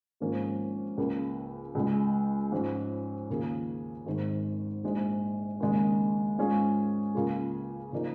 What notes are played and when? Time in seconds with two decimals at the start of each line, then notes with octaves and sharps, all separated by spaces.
0.20 G#1 G#2 F3 A#3 C#4
0.97 C#2 C#3 A#3
1.75 C#2 C#3 G#3
2.52 G#2 F3 G#3 C#4
3.30 D#2 C#3 A#3 F4 G#4
4.06 G#1 G#2 D#3
4.84 A#1 G#2 G#3
5.60 D#2 C#3 G#3
6.38 G#2 G#3 C#4 F4 G#4
7.15 C#2 C#3 A#3 F4 G#4
7.92 C#3 F3 A#3 D#4